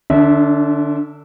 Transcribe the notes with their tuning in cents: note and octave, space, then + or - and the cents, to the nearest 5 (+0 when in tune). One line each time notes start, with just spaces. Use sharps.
D3 +25 D4 -35 E5 -15